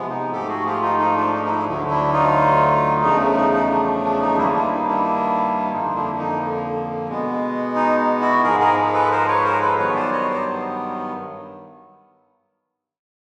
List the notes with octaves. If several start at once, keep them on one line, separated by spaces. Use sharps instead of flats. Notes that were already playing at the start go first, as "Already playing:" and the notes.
Already playing: C3 F3 G#3 B3
D#4
G#2 F3 A3 G4 A4
F#4 G#4
F4 G4
D#4 F4
D#4 F4
D4
D#4
D#4
D4 E4
D2 D3 F#3 A3
D4 E4
D#4 F4
E2 C#3 F3 A3 D#4
D#4
D#4
D4
D4
D#4
G2 D#3 G3 A#3 D4 E4
F4
D4 E4
D#4
D4 E4
F2 D3 F3 A#3 D#4 F4
D4 E4
D#4
B2 G#3 B3
D#4
E4 F#4
G#2 F3 G#3 G#4 A#4
G#4 A#4
A4 B4
A#4 C5
B4 C#5
A#4 C5
A4 B4
G2 D#3 F#3 B3 B4 C#5
C5 D5
C#5 D#5
C5 D5